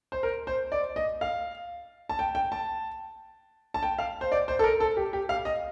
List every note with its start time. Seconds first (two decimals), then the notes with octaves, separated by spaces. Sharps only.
0.12 C5
0.23 A#4
0.47 C5
0.72 D5
0.96 D#5
1.21 F5
2.09 A5
2.19 G5
2.35 G5
2.52 A5
3.74 A5
3.83 G5
3.99 F5
4.21 C5
4.32 D5
4.48 C5
4.59 A4
4.64 A#4
4.80 A4
4.97 G4
5.13 G4
5.29 F5
5.45 D#5